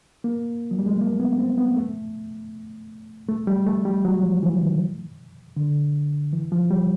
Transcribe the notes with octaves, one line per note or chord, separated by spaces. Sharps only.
A#3
F#3
G3
G#3
A3
A#3
B3
C4
B3
A3
A3
G3
A3
G3
F#3
F3
E3
D#3
D3
E3
F3
G3